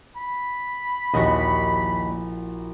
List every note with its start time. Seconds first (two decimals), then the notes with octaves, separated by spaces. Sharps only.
0.16 B5
1.14 A#1 D#2 E4 F#4 D#5